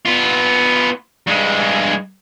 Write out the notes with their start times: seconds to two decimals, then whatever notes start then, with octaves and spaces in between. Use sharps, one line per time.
0.05 B3 F4
1.27 G2 G#3